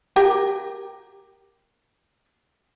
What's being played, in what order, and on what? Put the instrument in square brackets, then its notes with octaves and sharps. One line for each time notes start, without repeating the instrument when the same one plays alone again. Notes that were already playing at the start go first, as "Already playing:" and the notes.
[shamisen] G4 A#4 G5